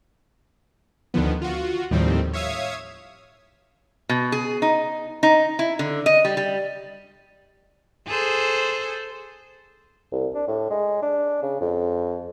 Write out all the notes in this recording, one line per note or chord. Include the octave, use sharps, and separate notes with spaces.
D2 D3 D#3 F3 B3
F4 F#4
D#2 A2 D#3 F3 G3 C4
C#5 E5 F5 D#6 G#6
B2
G#4
D#4
D#4
E4
D3
D#5
G3
G3
G#4 A4 C5
C2
D4
A2
G#3
D4
C#3
F2